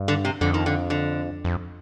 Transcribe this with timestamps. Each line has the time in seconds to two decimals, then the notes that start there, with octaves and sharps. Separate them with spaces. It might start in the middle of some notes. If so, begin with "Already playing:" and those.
Already playing: G2
0.08 D3
0.25 C3
0.41 F2 D3
0.54 D#3
0.66 D3
0.90 D3
1.44 F2